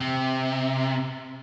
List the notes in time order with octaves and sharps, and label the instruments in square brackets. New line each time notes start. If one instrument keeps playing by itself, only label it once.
[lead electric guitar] C3